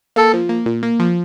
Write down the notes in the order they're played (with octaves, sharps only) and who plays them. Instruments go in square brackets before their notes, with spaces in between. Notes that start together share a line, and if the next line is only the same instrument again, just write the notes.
[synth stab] A#3 [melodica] A4
[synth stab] F3
A#3
A#2
A#3
F3